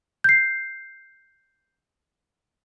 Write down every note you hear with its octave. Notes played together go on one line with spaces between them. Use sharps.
G6 C7